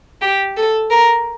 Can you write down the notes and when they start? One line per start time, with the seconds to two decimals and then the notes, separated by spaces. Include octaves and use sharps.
0.22 G4
0.57 A4
0.91 A#4